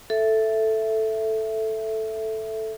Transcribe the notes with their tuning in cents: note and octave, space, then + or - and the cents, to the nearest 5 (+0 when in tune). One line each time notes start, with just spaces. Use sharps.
A4 +0 E5 +5